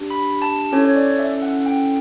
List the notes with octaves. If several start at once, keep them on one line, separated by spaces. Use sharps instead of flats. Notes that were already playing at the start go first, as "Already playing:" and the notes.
Already playing: D4 G4
B5
A5
C#4 E4 A4 C#5
C#5
D5
E5
F#5
G5